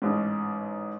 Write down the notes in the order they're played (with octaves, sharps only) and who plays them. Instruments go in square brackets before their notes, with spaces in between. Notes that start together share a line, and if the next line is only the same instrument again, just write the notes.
[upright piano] A1 G#2